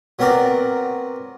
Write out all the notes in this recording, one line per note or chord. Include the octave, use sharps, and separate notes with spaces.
F#3 B3 C4 A#4 D5